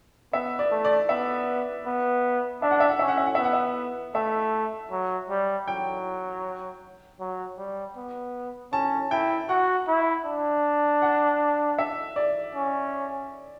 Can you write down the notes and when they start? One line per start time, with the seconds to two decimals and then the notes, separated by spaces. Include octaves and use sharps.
0.33 B3 E5
0.59 D5
0.71 A3
0.85 D5
1.09 B3 E5
1.86 B3
2.62 D4 E5
2.71 F#5
2.80 E5
2.90 F#5
2.99 C#4 E5
3.08 F#5
3.17 E5
3.26 F#5
3.35 B3 E5
3.44 F#5
3.53 E5
4.15 A3 E5
4.91 F#3
5.30 G3
5.67 F#3 G5
7.20 F#3
7.58 G3
7.96 B3
8.73 C#4 A5
9.11 E4 G5
9.49 F#4 F#5
9.87 E4
10.26 D4
11.02 F#5
11.79 E5
12.16 D5
12.55 C#4